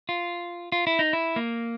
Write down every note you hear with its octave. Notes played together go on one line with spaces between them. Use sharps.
F4
F4
E4
D#4
E4
A#3